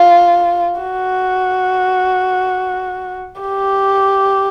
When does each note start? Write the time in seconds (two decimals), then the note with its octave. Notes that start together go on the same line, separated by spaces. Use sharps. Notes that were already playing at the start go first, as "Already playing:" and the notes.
Already playing: F4
0.81 F#4
3.42 G4